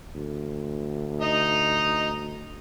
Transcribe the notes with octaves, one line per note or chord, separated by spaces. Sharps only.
D2
D#4 D#5